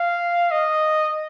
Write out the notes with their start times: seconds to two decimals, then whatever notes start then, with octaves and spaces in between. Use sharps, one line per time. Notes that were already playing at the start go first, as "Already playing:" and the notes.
Already playing: F5
0.51 D#5